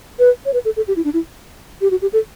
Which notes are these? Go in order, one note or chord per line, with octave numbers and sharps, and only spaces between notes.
B4
C#5
B4
A4
A4
G4
E4
D4
E4
G4
F#4
G4
A4